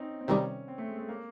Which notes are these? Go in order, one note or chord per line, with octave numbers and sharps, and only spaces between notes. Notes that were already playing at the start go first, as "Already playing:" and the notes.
Already playing: C4 C#4 D#4
C4
C3 D#3 G3 C#4
C4
A3
G#3
A3
A#3